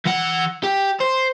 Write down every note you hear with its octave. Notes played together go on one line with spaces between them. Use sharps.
E3 F#5
G4
C5